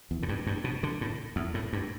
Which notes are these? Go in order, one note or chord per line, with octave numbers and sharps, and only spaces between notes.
E2
A2
G2
G2
B2
D3
A2
E2
A2
G2